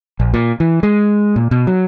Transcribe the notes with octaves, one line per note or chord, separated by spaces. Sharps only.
A#1
A#2
E3
G#3
A#2
B2
F#3